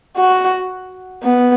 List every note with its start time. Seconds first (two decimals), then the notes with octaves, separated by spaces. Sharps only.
0.17 F#4
1.23 B3